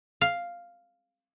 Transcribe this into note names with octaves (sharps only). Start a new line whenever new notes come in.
F5